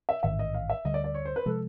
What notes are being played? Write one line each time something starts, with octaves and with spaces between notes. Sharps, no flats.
E5
A1 G#2 D#3 E5
D#5
F5
E5
D2 D3 G3 D#5
D5
D5
C#5
C5
B4
C3 F3 G#3 A4